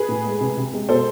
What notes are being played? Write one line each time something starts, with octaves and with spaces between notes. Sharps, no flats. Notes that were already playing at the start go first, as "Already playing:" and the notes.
Already playing: G#4 B4
A2
G#3
C3
C3
G#3
B2 A4 C5